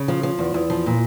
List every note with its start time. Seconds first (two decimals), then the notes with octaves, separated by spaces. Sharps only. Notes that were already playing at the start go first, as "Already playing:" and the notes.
Already playing: C#3
0.08 F3
0.23 F3
0.39 E2
0.54 E2
0.70 F3
0.86 A#2